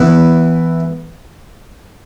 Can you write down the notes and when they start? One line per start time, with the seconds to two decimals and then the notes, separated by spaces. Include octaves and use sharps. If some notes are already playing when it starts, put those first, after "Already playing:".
Already playing: E3 B3 E4